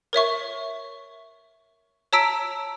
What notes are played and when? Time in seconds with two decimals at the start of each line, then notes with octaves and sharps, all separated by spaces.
0.13 A#4 C#5 E5 C#6
2.13 C#5 A5 A#5 E6 B6 D7